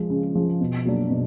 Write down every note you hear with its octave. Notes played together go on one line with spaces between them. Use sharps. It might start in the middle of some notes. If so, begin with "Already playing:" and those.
Already playing: F3 G#3
C#3
F3 G#3
B2
F#3 A#3 D4 F#4
B2